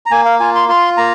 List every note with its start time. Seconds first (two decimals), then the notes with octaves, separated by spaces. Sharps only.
0.06 A#5
0.11 A#3 G#5
0.25 F5
0.40 F4 G#5
0.55 C6
0.68 F4 C6
0.97 A#3 A#5